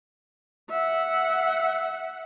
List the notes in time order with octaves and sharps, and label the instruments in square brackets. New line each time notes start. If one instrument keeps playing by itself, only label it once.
[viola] E5 F#5